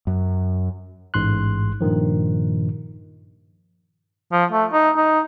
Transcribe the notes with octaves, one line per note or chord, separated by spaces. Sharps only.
F#2
A1 G#2 C6 F#6
G2 A#2 D#3 F3
F3
A3
D#4
D#4